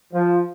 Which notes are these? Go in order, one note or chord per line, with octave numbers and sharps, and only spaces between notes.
F3